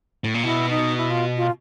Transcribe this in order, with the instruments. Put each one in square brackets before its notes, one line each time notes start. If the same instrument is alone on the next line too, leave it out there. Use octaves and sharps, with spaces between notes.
[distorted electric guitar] A2
A#2
[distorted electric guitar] B2 [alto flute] E4
[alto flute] D#4
E4
F4
F4